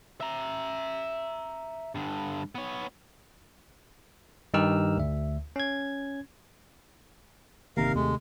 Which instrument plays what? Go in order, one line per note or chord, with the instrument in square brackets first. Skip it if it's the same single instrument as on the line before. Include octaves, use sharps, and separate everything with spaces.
[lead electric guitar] E5 A#5
G2 D3
B3 C#5
[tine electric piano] G2 D#3 D#4 G4 E6 F6
D2 E5
C#4 G#6
[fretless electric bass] G1 D#3 A#3 [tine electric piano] C3 [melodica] A#4 F5
[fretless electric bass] D#2 A3 [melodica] G#3